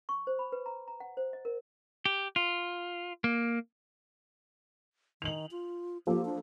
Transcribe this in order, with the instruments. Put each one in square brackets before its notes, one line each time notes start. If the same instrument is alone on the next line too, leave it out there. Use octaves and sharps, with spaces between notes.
[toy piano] C#6
C5
B5
B4
A#5
A#5
F#5
C5
D#5
A#4
[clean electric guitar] G4
F4
A#3
[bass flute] D#3 [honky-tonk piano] F7 F#7
[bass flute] F4
[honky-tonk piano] F3 A#3 A4 [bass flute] G4
[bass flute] D4